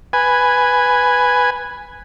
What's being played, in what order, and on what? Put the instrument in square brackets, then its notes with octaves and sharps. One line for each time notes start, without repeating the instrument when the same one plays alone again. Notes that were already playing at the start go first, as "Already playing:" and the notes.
[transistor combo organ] B4 G#5